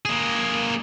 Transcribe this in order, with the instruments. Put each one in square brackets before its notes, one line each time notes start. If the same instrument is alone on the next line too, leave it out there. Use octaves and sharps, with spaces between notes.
[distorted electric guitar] A#3 G#4